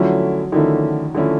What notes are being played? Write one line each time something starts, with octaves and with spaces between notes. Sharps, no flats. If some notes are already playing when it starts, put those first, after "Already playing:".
Already playing: D3 F3 F#3 A3 C#4 E4
D3 D#3 F3 A3 C#4 E4
D3 F3 A3 C#4 E4